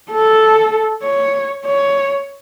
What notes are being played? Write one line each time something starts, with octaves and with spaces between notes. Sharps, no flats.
A4
C#5
C#5